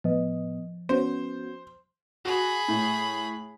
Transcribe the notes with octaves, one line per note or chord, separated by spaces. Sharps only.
A2 F3 B3 D#5
B3 C#4 F#4 C5
F#4 G#4 B5
A2